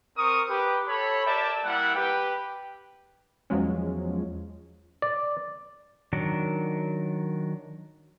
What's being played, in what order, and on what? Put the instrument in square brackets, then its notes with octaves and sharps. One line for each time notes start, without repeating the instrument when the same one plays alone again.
[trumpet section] C4 A#4 C#6 D#6
G4 B4
A4 C#5 B5
G4 A#4 D5 E5 G5 A5
G3 A#3 E4 F#5
G4 B4 G5
[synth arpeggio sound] E2 F3 F#3 G#3 C#4
[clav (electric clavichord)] D5
[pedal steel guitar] D#3 F#3 D4 A#4